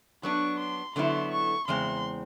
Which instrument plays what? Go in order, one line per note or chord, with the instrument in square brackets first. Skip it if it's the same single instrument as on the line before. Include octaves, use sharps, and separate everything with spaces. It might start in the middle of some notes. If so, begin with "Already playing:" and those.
[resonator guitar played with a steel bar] F#3 B3 D4 [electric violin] C#6
[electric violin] C6
[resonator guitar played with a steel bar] D3 F#3 B3 E4 [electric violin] C6
[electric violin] C#6
[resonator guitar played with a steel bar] E2 C#3 G#3 C4 [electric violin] C6